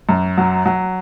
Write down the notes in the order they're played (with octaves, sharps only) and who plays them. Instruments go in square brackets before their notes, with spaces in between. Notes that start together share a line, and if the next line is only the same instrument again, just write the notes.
[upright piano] F#2
F#3
F#3